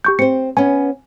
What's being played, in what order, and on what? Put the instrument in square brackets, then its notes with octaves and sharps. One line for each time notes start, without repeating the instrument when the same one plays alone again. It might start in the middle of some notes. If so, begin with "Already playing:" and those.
[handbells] G4 C#6 G6
[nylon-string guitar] C4 C5 [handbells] C#7
[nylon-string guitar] B3 C#4 [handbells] G#5